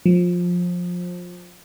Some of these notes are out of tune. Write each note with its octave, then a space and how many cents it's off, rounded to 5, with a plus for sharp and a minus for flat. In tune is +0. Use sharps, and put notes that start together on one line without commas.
F3 +20